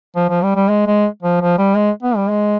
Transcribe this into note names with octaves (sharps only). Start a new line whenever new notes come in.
F3
F3
G3
G3
G#3
G#3
F3
F3
G3
G#3
B3
G3
G#3